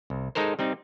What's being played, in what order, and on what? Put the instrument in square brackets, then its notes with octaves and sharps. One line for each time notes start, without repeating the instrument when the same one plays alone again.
[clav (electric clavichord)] C2
G#3 D#4 A4 A#4 C5
G3 C4 D#4